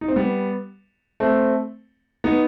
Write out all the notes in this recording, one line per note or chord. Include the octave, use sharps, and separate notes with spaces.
D#4
C4
G3 B3
A3 C4
B3 D#4